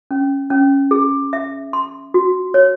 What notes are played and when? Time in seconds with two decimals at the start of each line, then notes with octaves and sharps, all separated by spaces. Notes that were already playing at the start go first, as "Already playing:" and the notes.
0.11 C#4
0.50 C#4
0.91 G#4
1.33 E5
1.73 C6
2.14 F#4
2.54 C#5